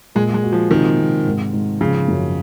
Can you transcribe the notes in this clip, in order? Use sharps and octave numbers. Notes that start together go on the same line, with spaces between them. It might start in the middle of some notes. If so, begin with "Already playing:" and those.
A#2 G#3
G#3
F#4
F3
C3 D#3
C3
G#2
G#2
C#3 F3
F#2